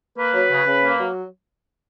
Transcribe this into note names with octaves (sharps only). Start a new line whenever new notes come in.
A#3 B4
F#3
C#3
C#3
A#3
F#3